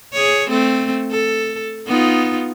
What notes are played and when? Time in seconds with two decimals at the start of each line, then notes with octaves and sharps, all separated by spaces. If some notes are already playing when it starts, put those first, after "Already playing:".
0.13 G#4 C#5
0.49 A3 C4
1.11 A4
1.86 B3 D#4 F4